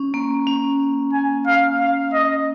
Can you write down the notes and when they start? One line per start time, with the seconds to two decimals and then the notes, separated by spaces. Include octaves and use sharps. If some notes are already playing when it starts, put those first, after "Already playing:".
Already playing: C#4
0.14 A#3
0.47 C#4
1.13 G#5
1.47 F5
1.80 F5
2.13 D#5